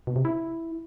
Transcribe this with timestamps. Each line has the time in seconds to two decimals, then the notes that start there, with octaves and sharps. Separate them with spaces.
0.07 B2
0.16 C3
0.25 E4